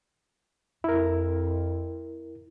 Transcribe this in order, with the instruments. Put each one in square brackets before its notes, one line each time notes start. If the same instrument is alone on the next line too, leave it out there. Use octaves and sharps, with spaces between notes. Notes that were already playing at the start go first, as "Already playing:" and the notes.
[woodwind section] F2 [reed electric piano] E4 A#4